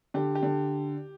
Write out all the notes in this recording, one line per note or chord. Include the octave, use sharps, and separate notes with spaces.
D3 G4
G4
D3